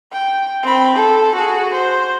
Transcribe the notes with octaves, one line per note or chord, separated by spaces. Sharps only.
G5
C4 B5
A4
F#4 G#4
C5